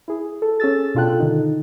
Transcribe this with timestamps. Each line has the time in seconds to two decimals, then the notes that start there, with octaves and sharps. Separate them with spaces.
0.08 E4 G#4
0.42 A4
0.60 C#4 G#4 E6 A6
0.95 B2 D4 F4 A4 G5 F#6
1.20 D3 D#3 D#4